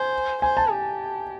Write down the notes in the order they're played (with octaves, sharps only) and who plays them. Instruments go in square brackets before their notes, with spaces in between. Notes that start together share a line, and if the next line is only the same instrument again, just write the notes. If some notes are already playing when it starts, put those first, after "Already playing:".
Already playing: [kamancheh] C5 [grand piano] G#5
[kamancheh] C5 [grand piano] G#5
[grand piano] A5
[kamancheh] G4